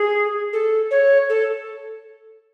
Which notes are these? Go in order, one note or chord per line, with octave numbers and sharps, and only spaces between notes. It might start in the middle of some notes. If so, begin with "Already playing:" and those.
Already playing: G#4
A4
C#5
A4